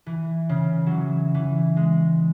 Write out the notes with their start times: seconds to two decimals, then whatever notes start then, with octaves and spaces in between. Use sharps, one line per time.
0.06 E3
0.49 C#3
0.86 E3 F#3
1.34 E3
1.77 G#3